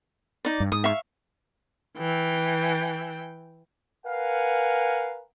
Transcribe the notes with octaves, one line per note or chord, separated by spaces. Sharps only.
D#4 D5
G2
G#2 D#6
E5 F5 C#6
E3 G5
A#4 B4 F5 F#5 G#5